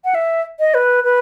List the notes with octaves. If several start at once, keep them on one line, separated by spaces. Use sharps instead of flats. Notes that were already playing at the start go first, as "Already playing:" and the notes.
F#5
E5
D#5
B4
B4